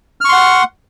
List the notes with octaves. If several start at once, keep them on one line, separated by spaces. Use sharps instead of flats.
F#5 C6 C#6 F6